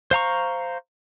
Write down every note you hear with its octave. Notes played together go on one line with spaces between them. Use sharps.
C5 F5 A#5 C#6